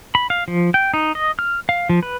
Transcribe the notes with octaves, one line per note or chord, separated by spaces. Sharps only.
B5
F5
F3
G5
D#4
D#5
F6
F5
F3
B4